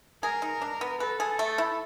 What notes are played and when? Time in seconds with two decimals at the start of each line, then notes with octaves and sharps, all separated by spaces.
0.23 G#4 A#4
0.42 D#4
0.62 D4
0.81 B3
1.00 A4 B4
1.20 G#4
1.39 A3
1.58 E4